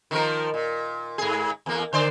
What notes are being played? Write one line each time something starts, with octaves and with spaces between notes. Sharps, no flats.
D#3 F3 A#4
A#2
G#2 G#4
E2 A#3
D3 C5 D5